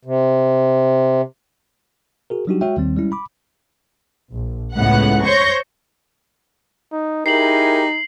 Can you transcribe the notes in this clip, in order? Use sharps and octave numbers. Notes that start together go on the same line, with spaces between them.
C3
F#4 G#4 A#4
F#3 G3 D4 D#4 F#4 G4
G#3 F#4 C#5 E5 G5
D#2 D#3 G3 C4
G3 G#3 C#4 E4
B5 D6
A#1
C#2 A2 B3 F#5 F#6
C5 C#5 C#6 G6 A#6
D#4
D#4 E4 G4 G#4 A#4 C7 F#7